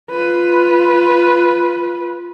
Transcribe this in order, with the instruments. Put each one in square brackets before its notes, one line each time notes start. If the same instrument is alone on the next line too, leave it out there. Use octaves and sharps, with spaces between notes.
[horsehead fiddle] F4 B4